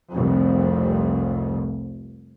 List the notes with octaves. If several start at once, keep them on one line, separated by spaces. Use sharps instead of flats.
F1 C2 F2